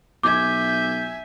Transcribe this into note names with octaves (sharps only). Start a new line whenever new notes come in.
B1 E5 G#5 D6 G6 G#6